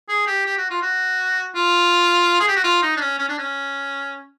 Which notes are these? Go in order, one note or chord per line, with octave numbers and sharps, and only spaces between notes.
G#4
G4
G4
F#4
F4
F#4
F4
G#4
G4
F#4
F4
D#4
D4
C#4
C#4
D4
C#4